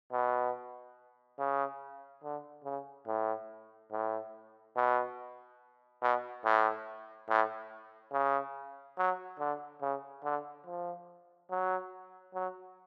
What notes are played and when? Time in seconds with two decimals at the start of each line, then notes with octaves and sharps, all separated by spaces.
0.12 B2
1.39 C#3
2.24 D3
2.65 C#3
3.07 A2
3.92 A2
4.76 B2
6.02 B2
6.45 A2
7.29 A2
8.13 C#3
8.98 F#3
9.39 D3
9.82 C#3
10.24 D3
10.66 F3
11.51 F#3
12.34 F#3